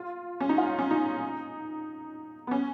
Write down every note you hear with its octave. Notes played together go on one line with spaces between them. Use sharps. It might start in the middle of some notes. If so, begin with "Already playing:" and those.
Already playing: F4
C#4
D#4
F4
C#4
D#4
B3
C#4